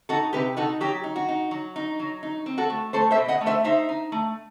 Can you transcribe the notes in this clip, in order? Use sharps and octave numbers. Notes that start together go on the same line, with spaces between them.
D#4 F#4 A4
C3 G4 B4
D#4 F#4 A4
F#3 G4
D#4
F#4
D#4
F#3
D#4
F#3
D#4
C4
F#4 A4
A3
A3 A4 C5
C5 E5
B2
D#5 F#5
A3
C5 E5
D#4 C5 E5
D#4
A3